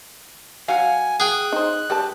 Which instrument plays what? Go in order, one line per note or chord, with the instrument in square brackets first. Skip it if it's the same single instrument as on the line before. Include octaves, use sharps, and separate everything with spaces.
[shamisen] F#3 [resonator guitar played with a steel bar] F5 F#5 [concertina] G#5
[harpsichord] G#4 G5 [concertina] F#6
[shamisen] D#4 C5
[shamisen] G3 B4 A5 [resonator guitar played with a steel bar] G4